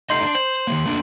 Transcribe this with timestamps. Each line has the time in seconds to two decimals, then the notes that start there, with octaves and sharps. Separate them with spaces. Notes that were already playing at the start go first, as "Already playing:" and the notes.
0.10 A3 D#4 D#5 C6 G6 C7
0.23 D4
0.35 C5 F#7
0.67 D#3 F3 A#3
0.86 A3 A#3 D4